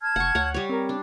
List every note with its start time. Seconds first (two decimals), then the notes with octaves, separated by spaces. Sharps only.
0.01 A5 F6 G#6
0.16 F1 F#5 C#6
0.35 D2 C#5 F#5
0.54 G3 C#5
0.69 C4 A#4
0.89 D4